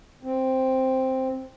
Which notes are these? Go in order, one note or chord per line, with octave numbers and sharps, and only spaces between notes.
C4